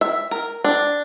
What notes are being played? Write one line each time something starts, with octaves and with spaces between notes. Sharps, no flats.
E5
A#4
D4